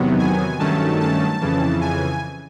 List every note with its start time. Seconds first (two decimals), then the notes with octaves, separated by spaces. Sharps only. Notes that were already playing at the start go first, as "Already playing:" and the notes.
Already playing: E2 C3 D#3 F#3 B3
0.19 G#5
0.59 G2 D#3 F#3 A3 C#4 A5
1.00 A5
1.41 F2 C#3 E3
1.81 G#5